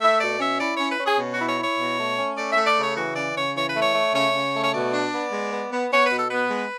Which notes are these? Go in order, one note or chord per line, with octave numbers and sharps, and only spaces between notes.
A3 E5
B2 D5
C#4 E5
E4 D5
C#5
C#4
B4
C#4
G#4
B2
F#4
E4
C#5
E4
C#5
B2
A3
C#4
A3 D5
A3 E5
D5
C#3 C#5
E3 F#4
C#3 D5
C#3 C#5
E3 C#5
B4
A3
C#5
A3
C#3 C#5
C#3
A3
C#5
B2 D5
D4
B3
G#3
B3
B3
B3 C#5
B4
B2
A4
B3 B4
G#3